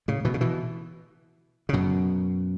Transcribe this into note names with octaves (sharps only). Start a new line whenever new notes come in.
A2 C#3
B2 E3
C#3
B2 E3
C#3
F#2 B2